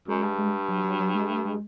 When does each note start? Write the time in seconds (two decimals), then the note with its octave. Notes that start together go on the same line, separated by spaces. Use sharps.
0.08 F#2 G#3
0.23 G2
0.38 G#3
0.68 F#3
0.84 F#3
0.99 F#3
1.15 G#3
1.30 A3
1.45 G#3